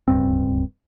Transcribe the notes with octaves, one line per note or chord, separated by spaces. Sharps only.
D1 C#2 G2 C4